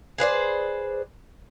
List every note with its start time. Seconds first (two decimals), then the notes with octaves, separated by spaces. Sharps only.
0.18 G#4 B4 C5 D5